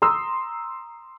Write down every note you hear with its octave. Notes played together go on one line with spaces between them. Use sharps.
A#5 C6 D#6 E6